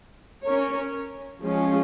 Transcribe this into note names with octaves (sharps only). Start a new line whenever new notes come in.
C#4 A#4 C#5
F3 G#3 C#4 F4